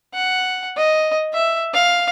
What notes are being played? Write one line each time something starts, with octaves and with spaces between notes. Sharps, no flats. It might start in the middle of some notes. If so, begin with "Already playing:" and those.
F#5
D#5
E5
F5